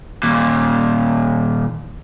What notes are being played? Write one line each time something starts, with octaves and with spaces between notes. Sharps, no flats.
D#2 A#2